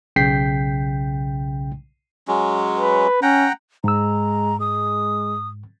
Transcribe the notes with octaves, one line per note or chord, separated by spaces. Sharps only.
B1 C#3 G5 G6 B6 C7
F#3 G#3 C#4
B4
C#4 F#5 G5 A#5
G#2 G#3 A#5 E6
G#3 D#6